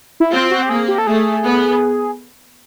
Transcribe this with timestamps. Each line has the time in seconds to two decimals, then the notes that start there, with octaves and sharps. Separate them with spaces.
0.20 E4
0.32 C4 F4
0.51 F#4
0.63 G4
0.69 A#3 G#4
0.88 G4
0.98 A4
1.06 A3 G#4
1.44 B3